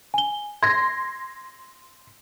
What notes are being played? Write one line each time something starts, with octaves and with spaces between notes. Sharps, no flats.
G#5 G7
C6 G#6 A#6